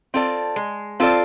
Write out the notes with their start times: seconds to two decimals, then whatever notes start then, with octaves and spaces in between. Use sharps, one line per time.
0.14 C4 F4 A4 D5
0.56 G#3
1.00 C4 F4 A4 D5